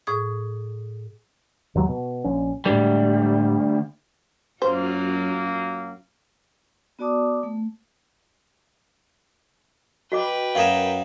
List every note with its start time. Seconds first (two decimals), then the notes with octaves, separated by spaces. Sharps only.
0.07 A2 G#4 D#6
1.75 D#2 F#3 G#3
1.88 B2
2.24 A#1 C#4
2.66 D2 A2 G3 G#3
4.62 F#2 F#3 A#3 F4 F#4 C5
6.99 B3 F#4 D5 A5 D6 D#6
7.43 A3
10.12 F#4 B4 D#5 G5 D6
10.55 F#2 G#4 A#4 F5 E7